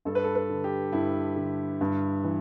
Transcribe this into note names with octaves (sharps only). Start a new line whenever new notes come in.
G2 A4
B4
A4
B4
D3
G4
G2 E4
D3
G2
E3